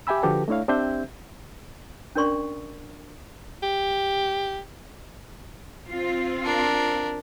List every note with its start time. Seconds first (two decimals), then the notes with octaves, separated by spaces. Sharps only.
0.07 G4 E5 G5 G#5 B5 E6
0.23 D3 F3 F#4 G4 A4 B4
0.48 A3 D4 E4 C#5 F5
0.68 C4 D4 G4 C5 E5 G6
2.15 C#4 D4 A#4 D5 C6 C#6
3.63 G4
5.88 C4 F4
6.44 D4 A#4